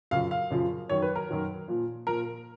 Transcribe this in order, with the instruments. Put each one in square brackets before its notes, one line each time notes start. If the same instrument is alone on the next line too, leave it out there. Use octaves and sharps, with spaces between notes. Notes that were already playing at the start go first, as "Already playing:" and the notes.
[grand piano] F#2 C#3 F3 F5
F5
F#2 C#3 F3
F#2 D#3 F#3 C#5
B4
A#4
F#2 D#3 F#3
A#2 F3
A#2 F3 A#4